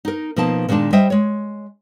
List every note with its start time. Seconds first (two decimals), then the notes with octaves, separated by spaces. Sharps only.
0.05 D#4 A#4
0.36 B2 F3 A#3 D#4 A5
0.68 A#2 D#3 G#3 D4 A5
0.93 G3 C5 D#5 E5 G5
1.10 G#3 C#5